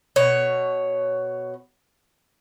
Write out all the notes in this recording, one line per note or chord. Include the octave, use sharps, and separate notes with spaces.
B2 C#5